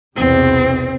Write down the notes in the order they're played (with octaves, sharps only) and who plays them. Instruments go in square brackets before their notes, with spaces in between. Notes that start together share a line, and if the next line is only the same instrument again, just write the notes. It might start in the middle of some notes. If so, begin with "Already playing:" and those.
[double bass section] B1 E2 C3 [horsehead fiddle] C4